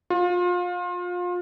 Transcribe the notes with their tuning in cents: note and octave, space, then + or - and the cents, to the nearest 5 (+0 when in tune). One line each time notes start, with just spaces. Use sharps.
F4 +30